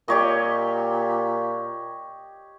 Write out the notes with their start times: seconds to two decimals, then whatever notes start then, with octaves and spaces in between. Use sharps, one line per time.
0.08 A#2 G4 C#5 D#5